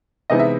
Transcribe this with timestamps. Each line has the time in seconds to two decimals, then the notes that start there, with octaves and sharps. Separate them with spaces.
0.30 C3 E3 G#3 B3 D#4 D#5
0.39 E5